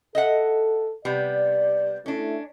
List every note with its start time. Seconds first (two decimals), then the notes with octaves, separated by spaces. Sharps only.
0.15 A4 D#5 E5 F#5
1.05 C3 G3 B3 D5
2.06 A3 C#4 D4 E4